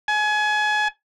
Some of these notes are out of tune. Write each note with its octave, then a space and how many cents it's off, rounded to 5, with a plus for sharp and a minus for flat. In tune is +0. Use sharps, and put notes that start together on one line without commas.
G#5 +30